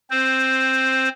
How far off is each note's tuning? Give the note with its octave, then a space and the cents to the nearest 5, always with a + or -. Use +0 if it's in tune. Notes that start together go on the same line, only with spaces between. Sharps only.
C4 +10 C5 +0